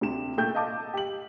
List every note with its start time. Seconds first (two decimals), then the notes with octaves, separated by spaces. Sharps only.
0.01 D2 C3 E7
0.38 A#2 A3 G5 E6 G6
0.55 D#5 F5 A5 D6
0.94 G4 F#7